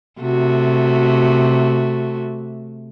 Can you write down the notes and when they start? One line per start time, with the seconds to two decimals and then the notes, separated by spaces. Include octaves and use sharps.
0.21 C3 A3 F#4